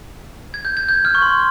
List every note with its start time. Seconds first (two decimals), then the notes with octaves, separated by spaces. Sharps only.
0.54 G#6
0.65 G6
0.77 G#6
0.89 G6
1.05 F6
1.15 C#6
1.22 C6